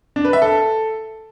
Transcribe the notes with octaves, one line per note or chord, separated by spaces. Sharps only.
D4
B4
E5
A4